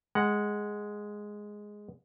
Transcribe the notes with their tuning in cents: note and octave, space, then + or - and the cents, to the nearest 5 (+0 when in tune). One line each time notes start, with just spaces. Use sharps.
G#3 +0 F#5 +5